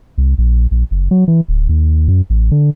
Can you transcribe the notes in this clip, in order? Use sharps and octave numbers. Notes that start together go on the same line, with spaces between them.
C2
A#1
A#1
F#1
F#3
E3
D1
D#2
F#2
A1
D3